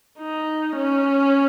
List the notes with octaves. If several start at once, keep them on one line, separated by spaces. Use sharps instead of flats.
D#4
C#4